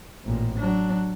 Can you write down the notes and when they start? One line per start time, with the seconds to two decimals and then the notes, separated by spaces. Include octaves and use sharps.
0.25 A1 A#2
0.60 F#3 D4